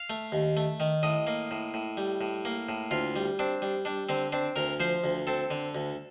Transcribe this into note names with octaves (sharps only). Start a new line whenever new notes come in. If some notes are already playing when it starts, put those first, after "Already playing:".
Already playing: F5
A3
D#2
A3
D#3
A2 D#5
A#3
A2
A2
G3
A2
A#3
A2
D2 F4
G3
C4 D4
G3
G3 D4
D3 C4
C4 D4
D2 A#4
F3 C5
D2
C4 A4
D3
D2